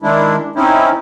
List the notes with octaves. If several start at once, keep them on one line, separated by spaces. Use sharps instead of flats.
D#3 G#3 D4 E4
C4 C#4 D#4 E4